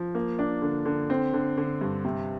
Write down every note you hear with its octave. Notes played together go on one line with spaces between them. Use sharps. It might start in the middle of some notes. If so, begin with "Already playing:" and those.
Already playing: F3
A#3
D4
D3
D3
C4
D3
D3
G2
C3